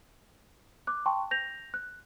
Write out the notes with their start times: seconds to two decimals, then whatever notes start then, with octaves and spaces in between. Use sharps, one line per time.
0.87 D6 F#6
1.06 G5 A5 C6 C#6
1.31 G6 A#6 F7
1.74 F#6